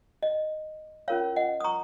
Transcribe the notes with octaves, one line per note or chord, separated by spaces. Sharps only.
D#5
C#4 F4 A#4 C#5 F5
D#5 F#5
D#6
A#5 C#6